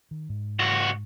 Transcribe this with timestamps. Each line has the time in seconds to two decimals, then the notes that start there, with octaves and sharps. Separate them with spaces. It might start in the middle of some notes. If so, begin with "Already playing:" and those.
0.11 D#3
0.29 G#2
0.59 C#2 F#4